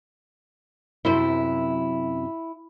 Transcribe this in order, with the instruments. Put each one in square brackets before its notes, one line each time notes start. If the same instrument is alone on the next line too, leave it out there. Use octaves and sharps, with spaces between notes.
[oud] F#2 C3 C5 [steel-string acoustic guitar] E4